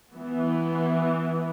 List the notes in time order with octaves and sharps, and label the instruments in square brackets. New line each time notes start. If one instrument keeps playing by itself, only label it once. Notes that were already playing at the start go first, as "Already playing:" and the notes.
[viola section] E3 B3